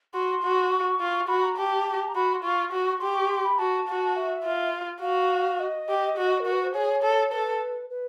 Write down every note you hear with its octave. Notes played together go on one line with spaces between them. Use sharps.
F#4 C6
F#4
C#6
F4
F#4 B5
A#5
G4 A5
A#5
F#4 B5
C6
F4 C#6
F#4
C#6
G4 C6
C#6
C6
B5
F#4 A5
F#4
E5
F4
F#4 F5
D#5
G4
F#4
A#4
F#4
B4
C5
G#4 C#5
A4
A4 B4
B4